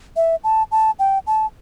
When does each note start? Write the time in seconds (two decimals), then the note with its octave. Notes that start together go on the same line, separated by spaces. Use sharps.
0.16 E5
0.44 A5
0.71 A5
0.99 G5
1.27 A5